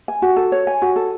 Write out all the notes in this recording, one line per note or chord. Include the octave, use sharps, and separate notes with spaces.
G#5
F#4
A4
C#5
G#5
F#4
A4